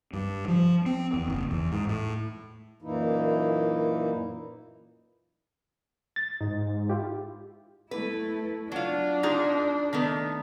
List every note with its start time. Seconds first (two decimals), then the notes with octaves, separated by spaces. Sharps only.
0.13 G2
0.48 F3
0.86 C4
1.14 E2
1.28 F#1
1.51 E2
1.72 G#2
1.88 A2
2.82 F#2 A#2 E3 A#3 D#4 E4
6.16 A6
6.41 G#2 D#4
6.90 E4 F4 G4
7.91 A3 E4 B4
8.72 F#3 D4 F4
9.23 D#4 F4 G#4
9.93 D#3 A3 B3